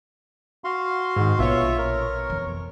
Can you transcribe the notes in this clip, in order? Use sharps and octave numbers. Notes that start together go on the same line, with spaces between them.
F#4 F5 C6
G#2 D#3
A#1 B2 F4 C#5 E5
A#4
F2 E3